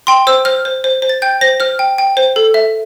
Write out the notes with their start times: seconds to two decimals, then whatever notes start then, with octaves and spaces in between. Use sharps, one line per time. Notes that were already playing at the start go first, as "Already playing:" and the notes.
0.07 G5 C6
0.27 C5 E6
0.45 C5 F6
0.65 C5
0.84 C5
1.02 C5
1.09 A6
1.22 G5 G6
1.41 C5 A#6
1.60 C5 F6
1.79 G5
1.98 G5
2.17 C5
2.36 A4
2.54 E5